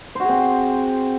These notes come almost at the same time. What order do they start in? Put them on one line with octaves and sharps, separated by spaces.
C5 F#4 G#4 C4